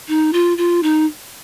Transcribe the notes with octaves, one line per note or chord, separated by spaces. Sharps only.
D#4
F4
F4
D#4